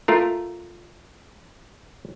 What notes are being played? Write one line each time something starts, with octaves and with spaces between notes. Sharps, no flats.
A3 F4 A#4